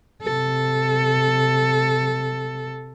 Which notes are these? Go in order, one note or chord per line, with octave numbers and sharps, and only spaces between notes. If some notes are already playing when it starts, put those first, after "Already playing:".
C3 A4